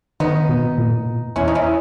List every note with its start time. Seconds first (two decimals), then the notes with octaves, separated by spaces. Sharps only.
0.20 D#3 B3 D#4
0.49 B2
0.78 A#2
1.36 E2 C#4 E4
1.48 D#4
1.55 C#4 E4